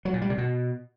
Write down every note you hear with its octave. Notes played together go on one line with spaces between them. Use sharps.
F#3
A#2
G3
C3
B2